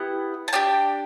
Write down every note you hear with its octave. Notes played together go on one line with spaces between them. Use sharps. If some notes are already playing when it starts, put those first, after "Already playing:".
Already playing: B3 E4 G4 F#5
A5
D4 G4 G5